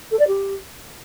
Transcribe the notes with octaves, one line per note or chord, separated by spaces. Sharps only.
A4
D5
G4